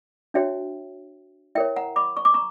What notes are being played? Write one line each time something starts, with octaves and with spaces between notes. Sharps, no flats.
D4 F#4 C#5 E5 G5
E4 A#4 C#5 E5 G5
F#5 A#5
B5 D6
C#6
D6
A#5 C#6